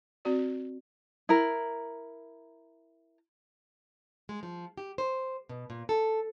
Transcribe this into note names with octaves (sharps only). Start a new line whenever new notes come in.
C4 F#4 D5
E4 A#4
G#3
F3
G4
C5
B2
A#2
A4